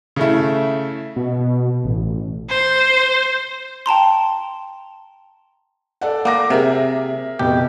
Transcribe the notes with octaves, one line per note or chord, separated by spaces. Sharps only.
C#3 A3 E4
B2
A1
C5
G5 A5 A#5 C6
A4 D5 F#5
A#3 F#5 D6 A#6
C3 G#4 A#4 E5
F1 B2 G4